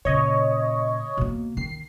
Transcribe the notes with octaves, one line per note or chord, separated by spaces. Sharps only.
A#2 C#3 C#5 D#5
B2 A#3
D#3 C7